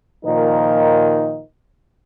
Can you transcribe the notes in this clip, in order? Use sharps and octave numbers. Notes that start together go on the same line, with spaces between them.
A#2 D#3 F3 D#4 A#4